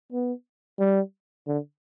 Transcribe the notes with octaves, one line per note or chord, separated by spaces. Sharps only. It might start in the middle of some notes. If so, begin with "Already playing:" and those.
B3
G3
D3